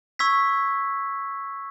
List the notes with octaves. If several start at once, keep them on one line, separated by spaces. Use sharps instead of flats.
C#6 E6 G#6 B6